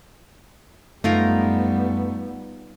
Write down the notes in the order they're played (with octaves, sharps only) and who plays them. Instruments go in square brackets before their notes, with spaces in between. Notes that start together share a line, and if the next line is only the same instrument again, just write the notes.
[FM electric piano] F#2 [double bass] G3 B3 [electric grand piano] A3 [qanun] D#4 F4 A#4